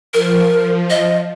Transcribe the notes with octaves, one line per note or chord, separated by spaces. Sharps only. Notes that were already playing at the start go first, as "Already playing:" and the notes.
F3 A#4
F3
D#5